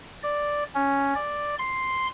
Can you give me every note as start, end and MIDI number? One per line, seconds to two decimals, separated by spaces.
0.23 0.64 74
0.75 1.14 61
1.15 1.55 74
1.59 2.07 84